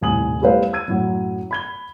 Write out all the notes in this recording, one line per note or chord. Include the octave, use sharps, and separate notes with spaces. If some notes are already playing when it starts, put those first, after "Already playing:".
D#1 C2 A2 G#5 D#6 F#7
G3 A3 E4 B4 C5 F5
E6 G#6 D#7
F#2 A2 F#3
B5 G#6 G7